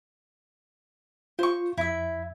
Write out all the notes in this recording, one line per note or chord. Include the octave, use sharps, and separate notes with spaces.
F4 C5 C#6
F2 E4 E5